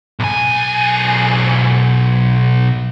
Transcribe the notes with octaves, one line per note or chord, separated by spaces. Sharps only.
B1 G#5